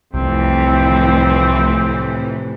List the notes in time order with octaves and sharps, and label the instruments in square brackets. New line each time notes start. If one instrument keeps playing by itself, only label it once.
[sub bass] C2 [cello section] F2 A2 E3 [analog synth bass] C3 [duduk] C4